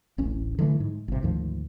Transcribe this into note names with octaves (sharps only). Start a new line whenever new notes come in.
D1 A1 C#4
D3 E3 F#3 A3
G#2
G1 C3
D2 G#2 D#3 F3